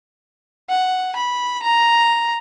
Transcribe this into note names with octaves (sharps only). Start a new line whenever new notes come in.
F#5
B5
A#5